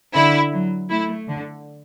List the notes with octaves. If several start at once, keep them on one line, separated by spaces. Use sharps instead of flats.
D3 E4
F#3
A3 E4
D3